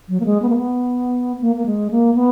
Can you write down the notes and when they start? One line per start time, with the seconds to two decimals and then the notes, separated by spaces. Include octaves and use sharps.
0.09 F#3
0.20 A#3
0.26 G#3
0.42 B3
0.50 A#3
0.56 B3
1.41 A#3
1.56 A#3
1.66 G#3
1.91 A#3
2.15 B3